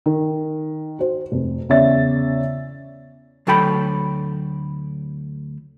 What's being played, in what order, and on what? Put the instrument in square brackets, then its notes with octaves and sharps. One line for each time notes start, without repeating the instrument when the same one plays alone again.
[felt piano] D#3
F#4 C5
F1
E2 C#3 C#5 D5 E5 A6
[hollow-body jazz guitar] D2 F#3 A4 G5 B5